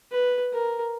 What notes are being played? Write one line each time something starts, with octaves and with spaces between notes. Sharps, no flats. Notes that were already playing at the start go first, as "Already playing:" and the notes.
B4
A#4